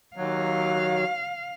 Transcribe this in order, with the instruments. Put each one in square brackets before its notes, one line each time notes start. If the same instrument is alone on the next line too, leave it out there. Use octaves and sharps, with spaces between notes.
[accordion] D#2 F#3 [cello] F5